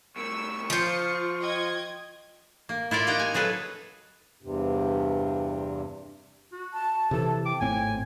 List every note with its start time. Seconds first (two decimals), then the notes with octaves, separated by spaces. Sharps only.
0.16 C2 A2 C#6 E6
0.70 F3 F4 C5 C#7
1.40 D#5 G5 G#6
2.69 A#3
2.91 E4 F4 A#4 D5
3.07 A#3 D#4 G4 F#5 G5
3.19 G#5
3.34 F#3 G#4 A4 B4
4.42 E2 G2 C3
6.53 F#4
6.73 A5
7.11 C3 E3 A4
7.45 G5 D6
7.61 G#1 A2 C4 G#5